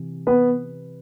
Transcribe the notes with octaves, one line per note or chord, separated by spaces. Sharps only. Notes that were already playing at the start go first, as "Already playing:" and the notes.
Already playing: C3 E3
B3 B4